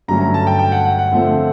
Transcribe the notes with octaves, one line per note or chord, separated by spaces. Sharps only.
G2 D3 F#3 A3 C#4 A#5
A#5
A5
G5
G5
F#5
F#5
F#5
D3 F3 A3 C4